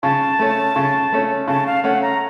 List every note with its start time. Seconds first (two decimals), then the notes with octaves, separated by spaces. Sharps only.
0.03 C#3 A5
0.39 A3 C#4
0.76 C#3
1.12 A3 C#4
1.47 C#3 A5
1.66 F5
1.84 A3 C#4 F#5
2.02 A#5